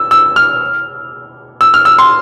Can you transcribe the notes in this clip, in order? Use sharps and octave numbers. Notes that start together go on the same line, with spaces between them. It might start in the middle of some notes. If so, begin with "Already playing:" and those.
Already playing: E6
E6
F6
E6
F6
E6
C6